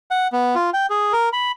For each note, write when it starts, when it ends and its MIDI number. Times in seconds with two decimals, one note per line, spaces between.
0.11 0.28 78
0.33 0.55 59
0.55 0.70 65
0.74 0.86 79
0.90 1.13 68
1.13 1.29 70
1.33 1.51 83